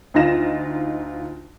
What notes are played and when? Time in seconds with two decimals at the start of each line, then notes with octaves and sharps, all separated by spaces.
0.14 D2 D#4 F4 A#6 E7